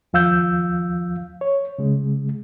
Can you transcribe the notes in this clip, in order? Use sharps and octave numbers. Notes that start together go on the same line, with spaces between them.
D#2 F3 F5 E6 G6
C#5
C#3 G#3